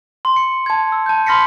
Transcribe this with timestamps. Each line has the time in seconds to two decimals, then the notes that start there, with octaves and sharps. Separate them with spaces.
0.25 C6
0.36 C#7
0.66 A5 G#6
0.92 E6
1.06 A5 G6
1.26 B5 C6 F6 A#6 B6 C#7